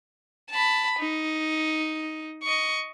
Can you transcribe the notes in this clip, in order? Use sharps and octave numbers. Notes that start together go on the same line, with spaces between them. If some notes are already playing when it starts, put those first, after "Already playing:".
A5 B5
D#4
D#5 C#6